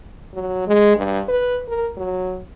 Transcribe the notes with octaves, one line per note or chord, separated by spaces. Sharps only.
F#3
G#3
G2
B4
A#4
F#3